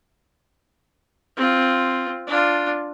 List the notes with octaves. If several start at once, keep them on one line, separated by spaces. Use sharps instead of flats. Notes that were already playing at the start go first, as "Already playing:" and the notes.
C4 F4
D4 F4